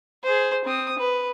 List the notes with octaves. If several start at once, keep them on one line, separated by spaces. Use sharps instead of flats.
G#4 C5
C4 D#6
B4